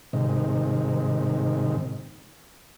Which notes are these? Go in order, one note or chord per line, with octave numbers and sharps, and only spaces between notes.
G#2 C3 D#3